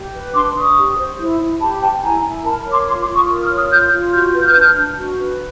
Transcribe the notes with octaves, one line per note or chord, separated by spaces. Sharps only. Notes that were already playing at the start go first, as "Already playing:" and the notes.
Already playing: G4
B4
D4 C6 D6
D4 C#6 D#6
G4
C5
E4
E4
G4 A5 B5
C5 G5 A5
E4 G#5 A#5
E4
A#4 A5 B5
C#5
C6 D6
F4 C6 D6
C6 D6
F4
C#6 D#6
A#4
D#6 F6
C#5
D#6 F6
F4 F6 G6
F4
F#4 F6 G6
B4
F6 G6
D4
D4
F#4
B4